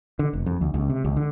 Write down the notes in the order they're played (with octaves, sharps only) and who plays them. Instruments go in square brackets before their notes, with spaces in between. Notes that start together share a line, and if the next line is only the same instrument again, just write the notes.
[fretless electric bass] D3
F1
F2
D2
C#2
C3
C#2
D3